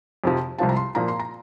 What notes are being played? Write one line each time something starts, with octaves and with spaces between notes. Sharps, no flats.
F2 C3 F3
C2 C3 F3 C4 F4 A5
A#5
C6
A#2 F3 A#3 A#5
C6
A#5